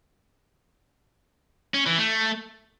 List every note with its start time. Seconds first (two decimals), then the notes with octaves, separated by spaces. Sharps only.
1.74 C#4
1.86 E3
1.98 A3